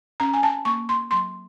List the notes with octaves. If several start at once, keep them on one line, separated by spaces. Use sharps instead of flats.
C#4 A#5
G#5
A5
A#3 C#6
C6
F#3 C6